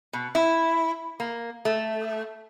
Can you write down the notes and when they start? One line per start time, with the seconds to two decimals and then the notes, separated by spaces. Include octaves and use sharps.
0.13 B2
0.35 E4
1.20 A#3
1.65 A3